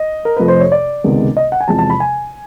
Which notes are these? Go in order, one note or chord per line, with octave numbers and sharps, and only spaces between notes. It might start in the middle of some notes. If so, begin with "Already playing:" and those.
Already playing: D#5
A#4
F2 C3 F3 A3 B4
C5
C#5
D5
C#2 C3 D#3 G#3 B3
D#5
F#5
G#5
E2 C3 F3 G#3 A5
A5
B5
G#5